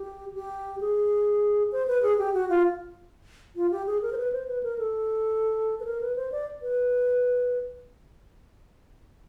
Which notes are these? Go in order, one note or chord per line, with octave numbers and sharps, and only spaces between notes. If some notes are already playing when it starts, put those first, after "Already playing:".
Already playing: G4
G4
G#4
C5
B4
G#4
G4
F#4
F4
F4
G4
G#4
A#4
C5
B4
C5
B4
A#4
A4
B4
A#4
B4
C5
D5
B4